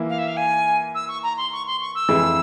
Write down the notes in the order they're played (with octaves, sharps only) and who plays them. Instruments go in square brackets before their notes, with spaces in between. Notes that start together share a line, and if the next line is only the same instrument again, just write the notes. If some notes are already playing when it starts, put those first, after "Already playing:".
Already playing: [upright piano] E3 A#3 E4
[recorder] F5
E5
F5
G#5
E6
C#6
A#5
C6
C#6
C6
C#6
E6
[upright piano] F2 E3 G#3 E4